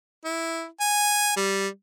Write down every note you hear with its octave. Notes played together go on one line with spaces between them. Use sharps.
E4
G#5
G3